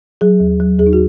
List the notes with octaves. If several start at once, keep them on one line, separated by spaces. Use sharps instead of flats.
F#3 G#4
D#2
F#3
D#2 G#4
D#4
F#4